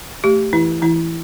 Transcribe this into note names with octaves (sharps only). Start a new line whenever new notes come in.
A3 G4
E3 E4
E3 E4